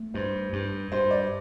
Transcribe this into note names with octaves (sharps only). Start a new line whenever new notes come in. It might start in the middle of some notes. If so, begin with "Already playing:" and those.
Already playing: A3
G2 C5
G2
G2 C5
D5